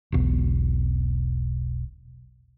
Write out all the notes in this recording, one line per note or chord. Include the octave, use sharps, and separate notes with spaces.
E1 B1